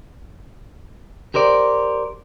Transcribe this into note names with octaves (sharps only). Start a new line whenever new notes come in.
G4 A#4 C5 D5